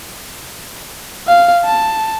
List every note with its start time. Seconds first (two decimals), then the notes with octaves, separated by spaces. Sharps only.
1.28 F5
1.65 A5